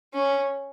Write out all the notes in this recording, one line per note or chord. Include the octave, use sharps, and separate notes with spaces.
C#4